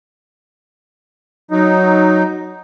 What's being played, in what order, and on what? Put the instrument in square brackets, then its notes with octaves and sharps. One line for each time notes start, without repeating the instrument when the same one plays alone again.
[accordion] F#3 D#4